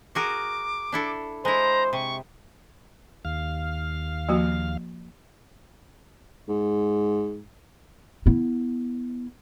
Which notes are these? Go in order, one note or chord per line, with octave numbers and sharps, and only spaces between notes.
F#4 G#4 A#4 D6
D4 E4 A4
G#3 E4 C5 A#5
C3 C#6
D#2 F5
F3 A#3 F#4
G#2
B3 E4